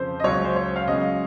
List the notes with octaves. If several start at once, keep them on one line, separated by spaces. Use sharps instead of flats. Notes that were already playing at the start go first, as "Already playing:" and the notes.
Already playing: F2 C#3 F3 C5
D#5
C#2 C#3 F#3 C#5
C5
C#5
F5
C#2 C#3 F#3 D#5